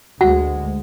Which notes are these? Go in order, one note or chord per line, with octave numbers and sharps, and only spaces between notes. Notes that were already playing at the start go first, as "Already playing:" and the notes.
D2 G#3 F#4 F#5